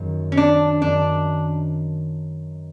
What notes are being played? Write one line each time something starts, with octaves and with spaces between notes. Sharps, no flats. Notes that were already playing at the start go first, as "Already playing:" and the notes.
Already playing: F#2 D#3 F#3 A#3
C#4
D4
F#2 D#3 F#3 A#3 D4